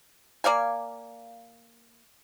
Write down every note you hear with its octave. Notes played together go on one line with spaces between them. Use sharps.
A#3 D5 F5 G#5